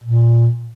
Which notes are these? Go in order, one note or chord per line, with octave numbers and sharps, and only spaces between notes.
A#2